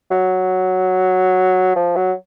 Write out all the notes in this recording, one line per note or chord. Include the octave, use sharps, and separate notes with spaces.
F#3
F3
F#3